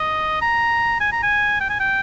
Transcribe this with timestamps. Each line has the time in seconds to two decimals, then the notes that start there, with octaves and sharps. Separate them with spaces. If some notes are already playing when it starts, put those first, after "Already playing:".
Already playing: D#5
0.42 A#5
1.00 G#5
1.12 A#5
1.23 G#5
1.60 G5
1.70 G#5
1.80 G5